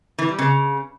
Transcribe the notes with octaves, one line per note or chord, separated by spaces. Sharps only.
E3
G3
C#3